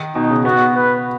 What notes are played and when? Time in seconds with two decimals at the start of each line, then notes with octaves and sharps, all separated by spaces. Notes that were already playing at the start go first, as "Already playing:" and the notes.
Already playing: D#3
0.15 B2 D#4
0.30 C#3
0.44 B3 F#4
0.75 B4